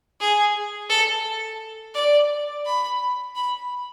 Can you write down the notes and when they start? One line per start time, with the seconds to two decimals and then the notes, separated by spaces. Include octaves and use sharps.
0.20 G#4
0.89 A4
1.94 D5
2.65 B5
3.35 B5